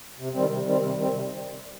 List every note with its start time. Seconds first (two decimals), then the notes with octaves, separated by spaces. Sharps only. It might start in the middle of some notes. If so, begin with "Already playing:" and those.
0.19 C3
0.33 D#3 G3 C4
0.49 C3
0.65 D#3 G3 C4
0.80 C3
0.95 D#3 G3 C4
1.11 C3